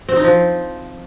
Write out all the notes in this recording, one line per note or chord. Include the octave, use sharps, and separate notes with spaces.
C4
D#4
F3